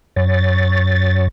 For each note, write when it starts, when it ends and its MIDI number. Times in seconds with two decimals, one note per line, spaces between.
0.16 1.28 42
0.16 1.28 73
0.16 1.28 93